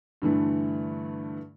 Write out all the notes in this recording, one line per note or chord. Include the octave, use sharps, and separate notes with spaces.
G2 D3 E3 A3